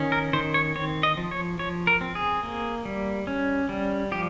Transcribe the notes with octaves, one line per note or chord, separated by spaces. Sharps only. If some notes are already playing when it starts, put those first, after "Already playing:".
Already playing: D#3 C#4
A#4
D#3 C5
C#5
C4 C#5
D#5
F3
C#5
F3 C#5
A#4
C4
G#4
A#3
G3
C#4
G3
F3 G4